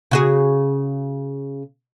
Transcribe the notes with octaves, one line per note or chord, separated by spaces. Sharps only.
C#3 F#4 G#4